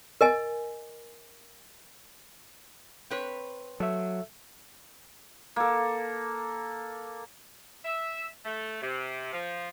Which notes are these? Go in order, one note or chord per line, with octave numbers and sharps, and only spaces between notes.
A#4 D#5 G#5
C4 B4 C#5
F#3 A4 E5
A#3 A4
E5
A3
C3
F3